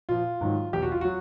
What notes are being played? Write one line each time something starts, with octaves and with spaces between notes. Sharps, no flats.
A#2 F3 F4
G#2 D#3 F#3
E2 B2 F#3 G4
F#4
F4
F#3 F#4